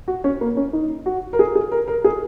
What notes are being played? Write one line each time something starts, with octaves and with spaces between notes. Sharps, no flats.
F#4
C#4
A#3
C#4
D#4
F#4
A#4
G#4
G#4
A#4
A#4
G#4